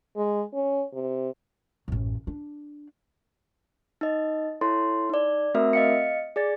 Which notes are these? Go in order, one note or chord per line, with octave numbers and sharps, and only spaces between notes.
G#3
C#4
C3
A1 F#2
D4
D#4 D#5
E4 A4 C#5 C6
D#4 D5
A3 C4 F#4 A#4 E5
D#5 F5 C#7
G#4 D5 A6